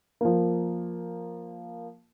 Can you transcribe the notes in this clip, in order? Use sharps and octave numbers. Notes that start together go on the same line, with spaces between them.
F3 A#3